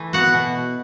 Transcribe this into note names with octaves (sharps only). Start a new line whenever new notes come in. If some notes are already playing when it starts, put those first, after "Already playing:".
Already playing: E3 A3
B3 F#4 F#5
B2